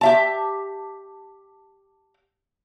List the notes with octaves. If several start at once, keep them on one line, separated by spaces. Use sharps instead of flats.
G4 E5 A5